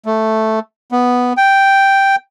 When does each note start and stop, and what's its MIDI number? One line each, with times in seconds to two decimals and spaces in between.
0.06 0.59 57
0.92 1.33 59
1.37 2.16 79